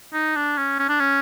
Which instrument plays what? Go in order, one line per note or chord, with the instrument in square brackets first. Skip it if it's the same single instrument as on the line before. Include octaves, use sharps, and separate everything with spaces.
[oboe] D#4
D4
C#4
C#4
D4
C#4